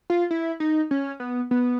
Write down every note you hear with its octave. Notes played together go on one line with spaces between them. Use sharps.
F4
E4
D#4
C#4
B3
B3